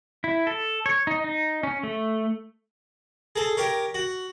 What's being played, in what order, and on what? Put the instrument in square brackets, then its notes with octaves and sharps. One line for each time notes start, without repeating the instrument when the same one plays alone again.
[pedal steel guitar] E4
A4
C#5
D#4
D#4
C#4
A3
[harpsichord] G#4 A4
G4 A#4 C#5
F#4